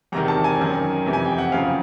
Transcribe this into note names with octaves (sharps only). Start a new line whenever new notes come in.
E2 C3 D#3 A#5
A5
G#5
F#2 D#3
F2 C3 E3
G#5
G5
F#5
F#2 C#3 F3 F5